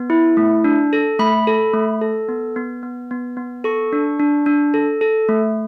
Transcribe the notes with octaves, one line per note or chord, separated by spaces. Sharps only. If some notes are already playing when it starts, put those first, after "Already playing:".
Already playing: B3
E4
A3
D4
A4
A3 B5
A4
A3
A4
B3
B3
B3
B3
B3
A4 C#6
D4
D4
D4
A4
A4
A3